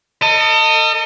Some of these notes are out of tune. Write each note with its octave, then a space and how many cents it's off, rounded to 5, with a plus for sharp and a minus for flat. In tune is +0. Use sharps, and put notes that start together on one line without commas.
A4 +40 D#5 -5